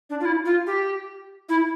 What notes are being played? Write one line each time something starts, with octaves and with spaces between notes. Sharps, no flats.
D4
F4
E4
F4
G4
E4